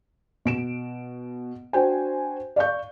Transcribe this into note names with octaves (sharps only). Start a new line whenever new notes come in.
B2 D7 E7
D4 F#4 C5 G5 G#5
D5 F5 C#6 G6